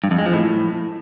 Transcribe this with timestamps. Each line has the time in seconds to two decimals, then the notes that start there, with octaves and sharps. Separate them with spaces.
0.04 G2
0.11 F2
0.18 G#3
0.26 F3
0.33 A2